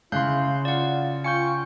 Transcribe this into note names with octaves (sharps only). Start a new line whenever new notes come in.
C#3 E4 F5 C6 F#6 G6
F4 D5 F#5
F4 G5 G#5 C#6 G6 C#7